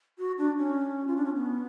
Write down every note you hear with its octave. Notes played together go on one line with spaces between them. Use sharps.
F#4
D4
C#4
F4
D4
C#4
B3